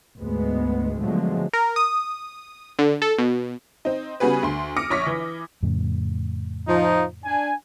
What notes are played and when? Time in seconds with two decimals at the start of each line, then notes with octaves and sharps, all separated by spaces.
0.18 D2 G#2 G#3 B3
1.00 B2 D3 F3 F#3 G#3 A3
1.53 A#4
1.76 D#6
2.79 D3
3.02 A4
3.18 B2
3.85 C4 D#4
4.20 C#3 G3 B3 F#4 G#4 B4
4.43 D2 C6
4.77 D6 D#6 F6 A#6 C#7 D7
4.90 A#1 C#5 C#6 A#6 B6
5.06 E3
5.63 F2 A2 C#3
6.68 F3 D#4
7.23 D4 G#5